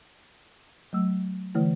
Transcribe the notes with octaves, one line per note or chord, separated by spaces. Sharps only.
F#3 A3 E6
D3 E3 A3 E4